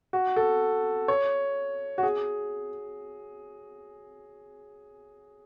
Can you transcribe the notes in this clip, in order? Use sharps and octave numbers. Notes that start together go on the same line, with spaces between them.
F#4
A4
C#5
F#4
G#4